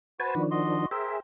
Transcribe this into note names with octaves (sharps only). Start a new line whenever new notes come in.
F#4 B4 C5 G#5 A5
D#3 F3 D4
F#4 D#5 C6
G#4 A#4 C5 E5 G5